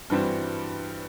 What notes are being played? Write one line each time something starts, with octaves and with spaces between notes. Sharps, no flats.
G2 E3 G3 C4 F#4